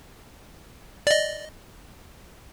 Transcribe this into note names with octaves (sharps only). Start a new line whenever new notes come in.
D5 D#5